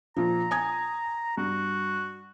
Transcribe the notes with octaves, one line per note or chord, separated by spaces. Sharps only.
A#2 F3 A#5
G#5 D#6 G#6
G2 F#4